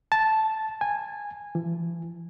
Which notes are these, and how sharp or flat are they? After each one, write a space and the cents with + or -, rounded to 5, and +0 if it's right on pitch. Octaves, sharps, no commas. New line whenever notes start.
A5 -5
G#5 -15
E3 +40